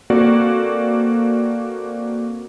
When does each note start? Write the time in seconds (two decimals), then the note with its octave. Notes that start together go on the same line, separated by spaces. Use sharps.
0.10 A#3 C4 F#4 A4 D5